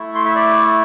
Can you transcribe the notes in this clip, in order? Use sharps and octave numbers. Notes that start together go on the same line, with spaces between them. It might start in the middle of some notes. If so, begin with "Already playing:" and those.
Already playing: A3 E4
C6
E5
D5